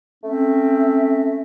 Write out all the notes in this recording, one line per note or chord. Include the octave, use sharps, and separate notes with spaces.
A3 C4 C#4 E5